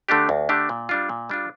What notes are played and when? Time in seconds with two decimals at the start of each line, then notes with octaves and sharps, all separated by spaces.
0.09 D3 A3 D4 G4
0.29 D2
0.49 D3 A3 D4 G4
0.69 A#2
0.89 G3 D4 F4
1.09 A#2
1.29 G3 D4 F4